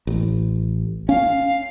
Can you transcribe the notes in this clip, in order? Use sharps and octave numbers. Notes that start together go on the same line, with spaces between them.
A1
C#4 F5